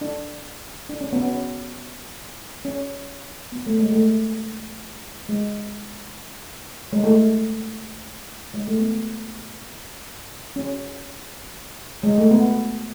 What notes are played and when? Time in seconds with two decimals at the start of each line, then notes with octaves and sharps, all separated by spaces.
0.01 D4
0.89 D4
1.01 C#4
1.13 B3
1.24 C#4
2.65 C#4
3.52 B3
3.66 A3
3.79 G#3
3.92 A3
5.29 G#3
6.93 G#3
7.04 A3
8.54 G#3
8.68 A3
8.79 B3
10.56 C#4
12.03 G#3
12.18 A3
12.31 B3